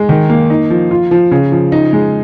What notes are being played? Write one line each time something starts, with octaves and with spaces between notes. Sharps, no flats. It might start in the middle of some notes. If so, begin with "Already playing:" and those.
Already playing: G#3
D#3
A#3
D#4
F3
F4
F3
C#3
F3
D#4
G#3